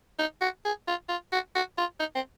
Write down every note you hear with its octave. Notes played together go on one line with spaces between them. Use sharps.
D#4
F#4
G#4
F4
F4
F#4
F#4
F4
D#4
C4